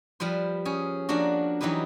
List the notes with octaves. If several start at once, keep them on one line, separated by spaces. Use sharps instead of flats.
F3 G3 B4 C5
C#4 G#4
F3 A#3 D4 F#4
E3 F#3 D#4 G4 B4